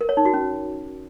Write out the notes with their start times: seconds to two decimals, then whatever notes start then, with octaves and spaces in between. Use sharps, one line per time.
0.01 A#4
0.09 C#5
0.17 D#4
0.25 F#4
0.34 C#4